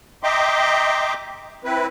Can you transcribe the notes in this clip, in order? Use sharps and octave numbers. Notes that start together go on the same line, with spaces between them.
D#5 E5 G5 A#5 C6 D6
C4 E4 B4